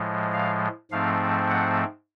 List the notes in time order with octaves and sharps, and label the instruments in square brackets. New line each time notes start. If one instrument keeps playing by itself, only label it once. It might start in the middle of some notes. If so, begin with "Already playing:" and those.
Already playing: [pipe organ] A2 F3 G#3
F5
G#2 F3 A3 C4 F5
F#5